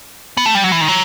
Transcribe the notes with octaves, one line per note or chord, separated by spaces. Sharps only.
B3
A3
G3
F#3
E3
D#3
F#3